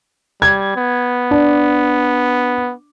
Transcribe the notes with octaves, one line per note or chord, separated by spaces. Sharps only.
G3 G#6
B3
D4